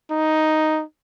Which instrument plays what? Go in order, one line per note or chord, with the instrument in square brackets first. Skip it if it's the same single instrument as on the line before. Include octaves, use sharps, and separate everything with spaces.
[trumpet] D#4